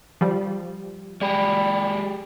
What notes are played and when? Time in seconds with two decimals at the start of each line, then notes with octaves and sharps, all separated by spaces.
0.21 F3 G3
1.21 G#3 G4 D5 B5